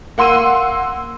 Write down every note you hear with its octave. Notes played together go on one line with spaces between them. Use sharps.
A#3 F#5 C6 E6 D#7